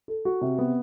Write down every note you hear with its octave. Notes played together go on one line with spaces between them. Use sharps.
A4
F#4
C3
B3